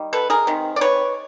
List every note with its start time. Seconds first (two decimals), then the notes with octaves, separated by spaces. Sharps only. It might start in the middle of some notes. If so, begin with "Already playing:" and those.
Already playing: D#3 G3
0.13 A4 B4
0.30 G#4 A#4
0.47 C3 D#3
0.76 D5
0.81 B4 C#5